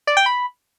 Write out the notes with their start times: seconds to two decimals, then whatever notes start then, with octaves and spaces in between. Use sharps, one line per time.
0.07 D5
0.17 G5
0.26 B5